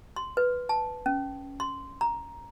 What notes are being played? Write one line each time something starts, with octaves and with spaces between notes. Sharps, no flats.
C6
B4
A5
C#4
C6
A#5